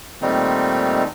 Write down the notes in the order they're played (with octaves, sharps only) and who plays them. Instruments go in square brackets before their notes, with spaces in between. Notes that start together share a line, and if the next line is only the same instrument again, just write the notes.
[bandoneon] A#2 D#3 G3 A3 C4 D#4